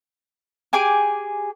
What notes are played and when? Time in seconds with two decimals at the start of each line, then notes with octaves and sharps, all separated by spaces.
0.73 G4 G#4 G#5 D6